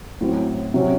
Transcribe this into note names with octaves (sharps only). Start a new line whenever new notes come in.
A2 F#3 C4
C3 F#3 C#4